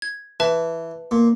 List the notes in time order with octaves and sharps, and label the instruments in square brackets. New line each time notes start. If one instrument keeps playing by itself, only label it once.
[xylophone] G#6
[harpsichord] E3 [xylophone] B4 E5 A5
[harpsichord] A#2